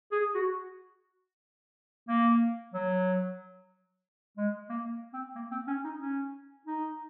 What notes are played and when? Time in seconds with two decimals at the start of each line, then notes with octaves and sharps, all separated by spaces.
0.12 G#4
0.35 F#4
2.08 A#3
2.74 F#3
4.37 G#3
4.69 A#3
5.13 C4
5.35 A#3
5.51 C4
5.68 C#4
5.84 D#4
6.00 C#4
6.66 D#4